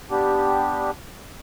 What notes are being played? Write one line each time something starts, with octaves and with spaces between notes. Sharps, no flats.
G3 B3 D4 G4